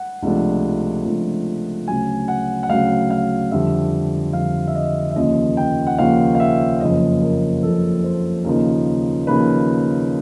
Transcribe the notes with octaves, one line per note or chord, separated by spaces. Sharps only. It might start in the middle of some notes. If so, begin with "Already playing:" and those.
Already playing: F#5
C#2 C3 F3 A3 D4
C#2 C3 F3 A3 D4
D2 C#3 F#3 G#5
F#5
F#5
D2 C#3 F#3 F5
F5
F2 D3 G3 E5
F2 D3 G3 F5
E5
D#5
E5
D#2 C#3 F3 A#3 C#4 D#5
G5
F#5
D#2 C#3 F3 A#3 C#4 F5
F5
E5
F#1 F2 C#3 F3 D#5
A#4
F#1 F2 C#3 F3 A4
C5
D#2 C#3 F3 A#3 D#4 A#4
D#2 C#3 F3 A#3 D#4 B4